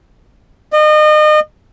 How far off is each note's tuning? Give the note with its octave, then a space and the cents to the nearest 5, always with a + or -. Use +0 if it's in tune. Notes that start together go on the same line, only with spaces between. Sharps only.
D#5 -35